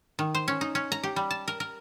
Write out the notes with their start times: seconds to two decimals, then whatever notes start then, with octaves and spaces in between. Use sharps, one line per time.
0.19 D#3
0.35 C5
0.48 C#4
0.61 D#4
0.75 C#4
0.92 A#5
1.03 G4
1.16 G3
1.31 A5
1.48 A#4
1.60 A#4